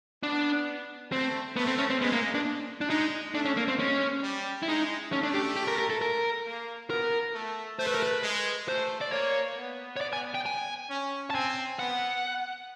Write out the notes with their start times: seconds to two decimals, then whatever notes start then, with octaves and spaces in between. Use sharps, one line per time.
0.23 B3 D4
1.12 A3 C4
1.56 A3 B3
1.67 C4
1.78 C#4
1.90 C4
2.01 G#3 B3
2.13 A#3
2.35 D4
2.81 D4
2.89 G#3 D#4
3.34 A3 D4
3.45 C#4
3.57 A#3
3.68 C4
3.79 G#3 C#4
4.23 G3
4.63 E4
4.68 G#3 D#4
5.12 A3 C#4
5.23 D4
5.34 G4
5.56 G4
5.68 A#4
5.79 A#4
5.90 A4
6.02 A#4
6.46 A#3
6.90 B3 A#4
7.35 A3
7.79 A3 C5
7.87 B4
7.94 A#4
8.03 B4
8.23 G#3
8.68 A3 C5
9.01 D5
9.12 A#3 C#5
9.58 B3
9.96 C#5
10.01 D5
10.13 G#5
10.35 G5
10.46 G#5
10.90 C#4
11.30 A5
11.34 C4 G#5
11.79 B3 F#5